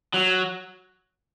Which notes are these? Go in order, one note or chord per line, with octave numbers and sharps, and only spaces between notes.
F#3